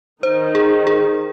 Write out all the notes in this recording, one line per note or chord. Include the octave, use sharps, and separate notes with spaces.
D#3 D#4 C5
G#4
G#4